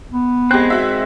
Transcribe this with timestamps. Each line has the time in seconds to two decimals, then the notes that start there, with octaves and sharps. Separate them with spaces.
0.11 B3
0.51 G#3 C4 G4 F#6
0.70 F#4 E5